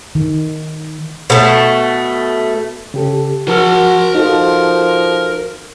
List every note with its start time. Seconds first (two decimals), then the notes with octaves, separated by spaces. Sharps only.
0.15 D#3
1.30 B2 A3
2.94 C#3 G4 A4
3.48 F3 F#4 A#4 A5 F6
4.15 F3 D#4 F#4 A4